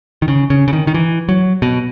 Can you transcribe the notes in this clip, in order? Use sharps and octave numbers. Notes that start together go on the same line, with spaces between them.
D#3
C#3
C#3
C#3
D#3
D#3
E3
F#3
B2